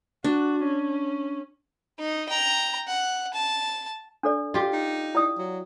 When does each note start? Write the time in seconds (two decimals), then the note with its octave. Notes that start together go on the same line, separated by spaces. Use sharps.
0.24 D4 F#4
0.64 C#4
1.99 D#4
2.29 G5 A#5
2.88 F#5
3.33 A5
4.23 D4 A4 D5
4.54 F4 G4
4.73 D#4
5.15 E4 D5 D#6
5.38 F#3